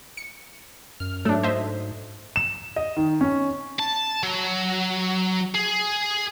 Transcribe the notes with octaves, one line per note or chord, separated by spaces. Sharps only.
C#7
F#2 F6
G#2 F#3 A3 D4 A4
C5 D#5 E5
E7
D#5
D#3
C#4
A5
F#3
G#4